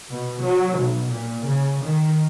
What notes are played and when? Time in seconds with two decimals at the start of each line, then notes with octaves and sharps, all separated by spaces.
0.11 B2
0.43 F#3
0.79 B1
1.11 A#2
1.46 C#3
1.84 D#3